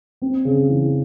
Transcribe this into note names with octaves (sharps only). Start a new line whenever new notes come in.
C4
C#3
E3